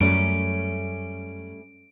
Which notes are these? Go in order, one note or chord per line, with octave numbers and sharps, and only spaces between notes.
F#2 G3 A3 C#4 D7